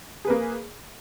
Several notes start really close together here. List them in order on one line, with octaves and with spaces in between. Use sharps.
G#4 B4 A#3